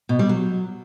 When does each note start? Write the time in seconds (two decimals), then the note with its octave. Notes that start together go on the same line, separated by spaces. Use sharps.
0.09 B2
0.19 G3
0.29 F#3